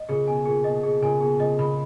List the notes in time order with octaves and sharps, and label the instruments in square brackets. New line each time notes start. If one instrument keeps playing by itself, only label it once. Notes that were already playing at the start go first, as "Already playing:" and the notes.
Already playing: [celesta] D#5
[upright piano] A#2 C#3 [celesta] G#4
[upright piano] B2 [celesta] G#5
[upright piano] A#2 [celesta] G#4
[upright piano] B2 [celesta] D#5
[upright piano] B2 [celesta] G#4
[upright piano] A#2 C#3 [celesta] G#5
[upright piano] B2 [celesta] G#4
[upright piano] A#2 C#3 [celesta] D#5
[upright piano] A#2 C#3 [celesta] B5